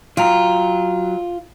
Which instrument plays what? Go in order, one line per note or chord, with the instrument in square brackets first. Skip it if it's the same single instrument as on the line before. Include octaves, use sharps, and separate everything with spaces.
[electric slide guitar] F#3 G5 A#5 [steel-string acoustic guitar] F4